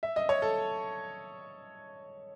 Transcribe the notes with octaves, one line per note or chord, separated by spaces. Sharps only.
E5
D#5
C#5
A4